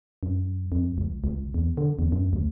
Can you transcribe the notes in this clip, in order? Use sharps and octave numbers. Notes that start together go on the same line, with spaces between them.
F#2
F2
C#2
C#2
E2
D3
E2
F#2
D2